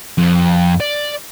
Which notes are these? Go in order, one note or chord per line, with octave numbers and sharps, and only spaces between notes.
F2
D5